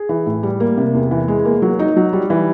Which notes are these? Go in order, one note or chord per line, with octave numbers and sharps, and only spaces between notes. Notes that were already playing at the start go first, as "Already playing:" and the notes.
Already playing: G#4
E3
A2
G3
A#3
C3
E2
E3
G#3
A#3
F#3
D#4
F#3
G3
E3